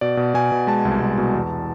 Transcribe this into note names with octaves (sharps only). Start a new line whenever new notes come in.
B2 D5
B2
B2 G#5
B2
G#3 A5
C2
C2
B2
E2